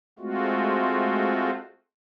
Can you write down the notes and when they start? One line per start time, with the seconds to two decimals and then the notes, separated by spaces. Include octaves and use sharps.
0.19 G#3 A3 C4 F4 F#4